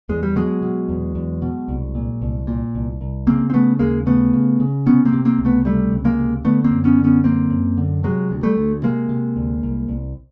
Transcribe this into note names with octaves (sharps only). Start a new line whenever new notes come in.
E2 G#3
G3
B2 F#3 G#3
B2
E2
E2
B2
C2
A#2
C2
A#2
C2
C2
C#3 A#3 C4
C4
C#3 A3 B3
D#2 G#3 A#3
C#3 A3 B3
C#3
C#3
C3 B3 C#4
A#3 C4
C3
A#3 C4
C#2
A3 B3
C3 G3 A3
C#2
G#3 A#3
C3
D3 A3 B3
A#3 C4
F#2
B3 C#4
D3
B3 C#4
F#2 A#3 C4
F#2
D3
C3 F#3 G#3
D2
G3 A3
D2
C3 G#3 A#3
C3
D2
C2
C2